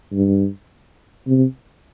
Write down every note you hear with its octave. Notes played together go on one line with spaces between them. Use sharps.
G2
C3